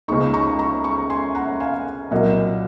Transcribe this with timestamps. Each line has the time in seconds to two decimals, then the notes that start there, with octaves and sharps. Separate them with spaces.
0.08 C#2 C#3 G#3 D#4 A#5 C#6
0.34 A#5 C#6
0.59 A#5 C#6
0.84 A#5 C#6
1.10 G#5 C6
1.35 F#5 A#5
1.60 F5 G#5
2.11 C2 A#2 F#3 A#3 D#5 F#5